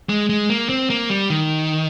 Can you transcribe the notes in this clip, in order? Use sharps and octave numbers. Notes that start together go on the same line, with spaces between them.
G#3
G#3
A#3
C4
A#3
G3
D#3